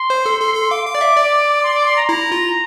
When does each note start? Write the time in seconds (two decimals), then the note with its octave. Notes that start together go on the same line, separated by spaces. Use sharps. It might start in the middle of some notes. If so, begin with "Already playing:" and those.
Already playing: C6
0.10 C5
0.26 A4
0.41 A4
0.55 A4
0.71 F5 D6
0.87 F5
0.95 D5
1.01 E5
1.17 D5
1.63 C6
1.75 D6
1.86 C6
1.97 A#5
2.09 E4 A#5
2.32 F4